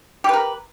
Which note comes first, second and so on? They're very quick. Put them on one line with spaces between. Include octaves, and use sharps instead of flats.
G4 B4 A#4